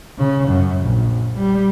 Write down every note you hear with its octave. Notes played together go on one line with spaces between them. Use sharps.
C#3
F#2
A#1
G3